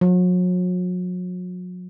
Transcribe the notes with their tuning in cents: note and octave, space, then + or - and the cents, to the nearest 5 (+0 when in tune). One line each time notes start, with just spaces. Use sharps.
F#3 -40